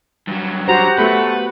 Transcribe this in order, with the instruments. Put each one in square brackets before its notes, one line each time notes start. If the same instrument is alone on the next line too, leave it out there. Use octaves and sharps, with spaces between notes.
[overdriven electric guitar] G2 F#3
[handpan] F#4 G4 C5 [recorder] F#5 [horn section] A#5
[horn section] A3 [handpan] B3 F#4 [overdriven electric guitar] B4